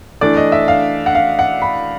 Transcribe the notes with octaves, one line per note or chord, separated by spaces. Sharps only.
E3 A3 D4 D5
D#5
E5
F5
F#5
F5
F#5
B5